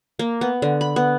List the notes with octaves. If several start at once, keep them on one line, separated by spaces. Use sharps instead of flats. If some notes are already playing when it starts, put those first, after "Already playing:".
A#3
B3
D3
B5
B3